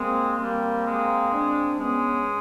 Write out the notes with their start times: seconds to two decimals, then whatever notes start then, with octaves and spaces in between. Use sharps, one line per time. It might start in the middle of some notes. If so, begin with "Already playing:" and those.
Already playing: G#3 A#3 C4
0.40 G3 A#3 C4
0.87 G#3
1.33 C4 D4
1.79 G#3 B3 C#4